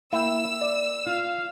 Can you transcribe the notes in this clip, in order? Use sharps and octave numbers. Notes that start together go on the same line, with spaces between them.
A#3 E4 G5 E6
D5
F4 F5